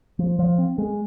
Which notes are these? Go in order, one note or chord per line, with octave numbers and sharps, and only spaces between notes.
F3
F3
C4
G#3